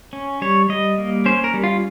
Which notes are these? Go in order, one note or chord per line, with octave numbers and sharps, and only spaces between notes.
C#4
G3 C#5
G3 D#5
A#3
C#4 C5
A#4
G3
F4